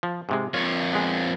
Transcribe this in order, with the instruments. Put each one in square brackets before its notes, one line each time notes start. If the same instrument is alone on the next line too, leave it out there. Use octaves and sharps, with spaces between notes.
[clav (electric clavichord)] F3
G#2 C3 G#3
[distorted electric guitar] F2 C#5 [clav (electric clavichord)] F4
[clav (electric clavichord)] G#3 B3